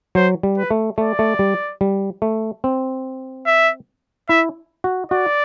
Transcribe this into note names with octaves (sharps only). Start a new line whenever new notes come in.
F#3 C5
G3
B4
A3
A3 D5
A3
G3
G3
A3
C4
E5
E4 E5
F#4
F#4 D5